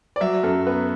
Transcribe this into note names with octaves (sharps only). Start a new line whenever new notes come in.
D5
F#3 E5
F#2 A4
B3 B4